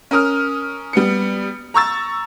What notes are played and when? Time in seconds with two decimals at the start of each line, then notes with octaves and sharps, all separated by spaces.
0.11 C#4 A#4 D#6 F6
0.93 G3 B3 C#7
1.74 A#5 C#6 E6 A6